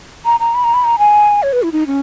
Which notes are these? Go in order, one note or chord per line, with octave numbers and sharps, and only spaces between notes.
A#5
A#5
B5
A#5
B5
A#5
G#5
C#5
B4
E4
D#4
C#4